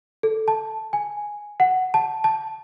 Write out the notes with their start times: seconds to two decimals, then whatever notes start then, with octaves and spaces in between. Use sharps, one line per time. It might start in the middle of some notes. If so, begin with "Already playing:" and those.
0.23 A4
0.48 A5
0.93 G#5
1.60 F#5
1.94 A5
2.24 A5